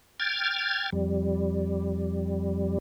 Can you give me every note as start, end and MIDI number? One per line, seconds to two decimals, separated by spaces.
0.20 0.90 79
0.20 0.90 89
0.20 0.90 92
0.20 0.90 93
0.92 2.78 41
0.92 2.78 55